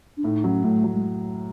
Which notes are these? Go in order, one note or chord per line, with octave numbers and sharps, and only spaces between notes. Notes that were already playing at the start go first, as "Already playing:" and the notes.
D4
A2 D#4
F#3 C#4
A2 A3
F#3
G#3